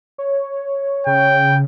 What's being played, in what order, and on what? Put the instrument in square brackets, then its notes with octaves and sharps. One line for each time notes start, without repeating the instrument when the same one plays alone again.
[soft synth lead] C#5
[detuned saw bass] C#3 [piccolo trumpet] G5